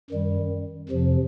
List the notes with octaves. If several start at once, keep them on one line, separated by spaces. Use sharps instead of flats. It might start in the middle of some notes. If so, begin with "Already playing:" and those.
F#2 D#3 G3
F2 C3 F3